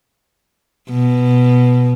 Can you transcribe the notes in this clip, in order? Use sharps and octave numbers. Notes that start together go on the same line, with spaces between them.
B2